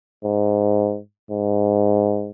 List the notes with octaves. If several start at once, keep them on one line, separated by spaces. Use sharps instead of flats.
G#2
G#2